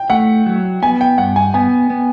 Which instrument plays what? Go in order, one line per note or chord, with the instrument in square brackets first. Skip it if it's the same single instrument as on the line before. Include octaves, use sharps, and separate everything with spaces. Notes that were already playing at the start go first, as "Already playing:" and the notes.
Already playing: [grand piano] G5
[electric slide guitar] A3 [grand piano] F#5
[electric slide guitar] F#3
[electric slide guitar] B3 [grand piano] G#5
[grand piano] G5
[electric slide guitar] G2 [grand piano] F#5
[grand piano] G#5
[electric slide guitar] B3 [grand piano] G#5
[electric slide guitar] B3